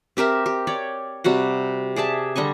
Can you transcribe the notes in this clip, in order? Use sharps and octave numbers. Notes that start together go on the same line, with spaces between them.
C4 G4 A#4 E5
G4
C#5 D5 G5
C3 G3 F#4 F#5
G#4 D5 E5 A5
D3 G3 D#5 C#6